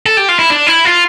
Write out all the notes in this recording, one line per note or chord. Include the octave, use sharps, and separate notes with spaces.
A4
G4
F4
E4
D4
E4
F4